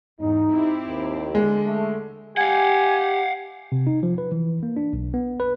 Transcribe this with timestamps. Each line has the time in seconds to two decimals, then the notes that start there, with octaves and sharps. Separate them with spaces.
0.21 E2 G#2 D#4
0.54 C4 E4 G4
0.88 D#2
1.35 D3 G#3
1.66 A3
2.37 G4 F5 F#5 G#5
3.72 C3
3.87 D#4
4.03 F3
4.18 B4
4.32 E3
4.63 A#3
4.77 D4
4.93 B1
5.14 B3
5.40 B4